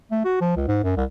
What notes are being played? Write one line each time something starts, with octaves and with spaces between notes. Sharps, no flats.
A3
F#4
F3
C#2
G#2
F#2
C2